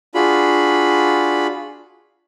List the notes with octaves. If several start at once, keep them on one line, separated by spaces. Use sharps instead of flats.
D4 F4 F#4 G#4 B5